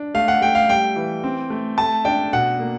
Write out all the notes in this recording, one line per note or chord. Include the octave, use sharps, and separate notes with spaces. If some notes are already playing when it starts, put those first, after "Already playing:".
Already playing: D4
A3 F5
F#5
A3 G5
F5
G3 G5
E3
C4
A3
A3 A5
D4 G5
B2 F#5
A#3